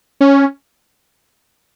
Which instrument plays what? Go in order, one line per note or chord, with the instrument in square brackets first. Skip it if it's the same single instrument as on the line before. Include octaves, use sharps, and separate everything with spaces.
[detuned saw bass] C#4